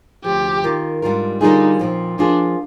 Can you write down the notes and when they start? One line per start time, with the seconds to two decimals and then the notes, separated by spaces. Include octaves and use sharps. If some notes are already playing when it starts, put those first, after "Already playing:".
0.24 D2 C3 F3 G4
0.64 D#3 A#3 F4 A#4
1.02 G#2 G3 D4 F4 A#4
1.41 D3 G3 A#3 D#4 F4 G#4
1.79 A#2 F3 C4
2.19 F3 A#3 D4 F4 G#4